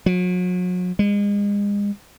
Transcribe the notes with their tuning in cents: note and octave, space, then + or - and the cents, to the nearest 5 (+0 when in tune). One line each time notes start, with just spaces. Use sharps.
F#3 -40
G#3 -35